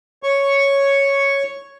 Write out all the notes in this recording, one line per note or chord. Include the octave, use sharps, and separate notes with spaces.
C#5 C#6